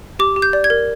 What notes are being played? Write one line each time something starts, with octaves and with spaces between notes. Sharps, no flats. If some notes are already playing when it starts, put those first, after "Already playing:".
G4 D6
G4
G6
D5
G#6
A#4